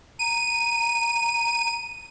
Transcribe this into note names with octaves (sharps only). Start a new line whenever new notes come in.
A#5 D#7